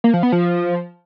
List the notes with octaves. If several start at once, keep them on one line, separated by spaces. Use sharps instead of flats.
A#3
F3
B3
F3